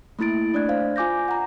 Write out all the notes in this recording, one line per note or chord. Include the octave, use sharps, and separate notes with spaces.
A3 A#3 E4 A6 D7
A3 D4 D5 D#5 F#6 G#6
C5 F5
F4 G#5 D6 G6 A#6
F#5 A#5